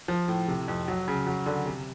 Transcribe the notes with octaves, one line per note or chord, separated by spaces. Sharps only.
F3
A2
C3
F2
F#3
C#3
F#3
D3
C3